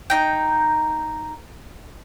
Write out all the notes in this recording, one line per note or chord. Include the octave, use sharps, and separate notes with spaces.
D#4 G5